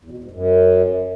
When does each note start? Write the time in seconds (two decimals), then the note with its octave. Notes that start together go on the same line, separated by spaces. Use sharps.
0.05 E2
0.11 B2
0.18 E2
0.24 G#2
0.31 F#2